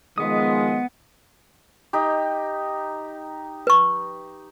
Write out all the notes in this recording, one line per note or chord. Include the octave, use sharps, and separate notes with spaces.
D#3 F3 G#3 B3 D#6
D#4 G4
B4 C#6